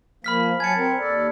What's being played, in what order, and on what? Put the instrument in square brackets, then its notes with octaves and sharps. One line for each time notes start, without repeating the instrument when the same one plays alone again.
[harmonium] F3 A#3 [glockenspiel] B5 F6 B6
[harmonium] F#3 G#5 A5 [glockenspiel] G#6 C#7
[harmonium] C4 A#4
D#2 A4 D5